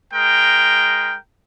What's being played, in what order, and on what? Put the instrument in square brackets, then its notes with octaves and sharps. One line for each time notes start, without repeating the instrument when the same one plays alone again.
[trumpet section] G#3 A#4 G5